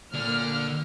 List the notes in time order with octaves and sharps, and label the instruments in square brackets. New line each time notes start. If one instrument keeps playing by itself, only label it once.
[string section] A#2 F6 [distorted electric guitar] D3